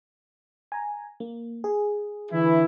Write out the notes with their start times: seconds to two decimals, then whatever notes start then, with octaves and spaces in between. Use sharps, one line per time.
0.72 G#5 A#5
1.20 A#3
1.64 G#4
2.31 D3 E3 E4